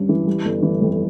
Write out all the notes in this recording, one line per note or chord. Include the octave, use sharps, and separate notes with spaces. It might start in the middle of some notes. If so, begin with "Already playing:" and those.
Already playing: G2 G3 C#4
E3
G3
G1
E3
F2